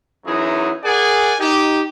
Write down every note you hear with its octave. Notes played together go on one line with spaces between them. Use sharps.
F#2 E3 F#3 D#4 E4 G#4
G#4 A#4 D5 F#5 G#5
D#4 G4